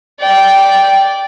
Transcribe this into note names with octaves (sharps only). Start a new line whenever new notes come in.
D5 G5